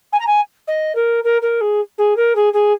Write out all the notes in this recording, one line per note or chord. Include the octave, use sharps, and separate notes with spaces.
G#5
A#5
G#5
D#5
A#4
A#4
A#4
G#4
G#4
A#4
G#4
G#4